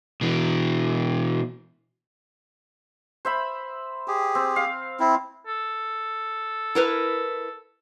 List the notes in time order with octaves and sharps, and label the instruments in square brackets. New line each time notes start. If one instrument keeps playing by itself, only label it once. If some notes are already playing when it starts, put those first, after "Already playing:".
[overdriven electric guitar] B2 E3
[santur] C5 E5 B5
[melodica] G4 G#4
[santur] C4
F5
[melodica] C4 E4
[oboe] A4
[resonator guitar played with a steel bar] E4 A#4 B4